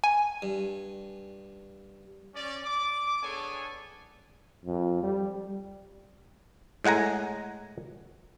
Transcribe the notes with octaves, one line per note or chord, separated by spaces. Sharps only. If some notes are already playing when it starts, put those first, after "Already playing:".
G#5
G2
C#4 D5
D6
B3 D4 G#4 A4 C#5 G#5
F2
G3
A2 G#3 F#5 G#5 A#5